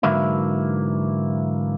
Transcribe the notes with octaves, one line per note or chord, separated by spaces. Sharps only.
G#2 D3 E3 F#3 A#3 E4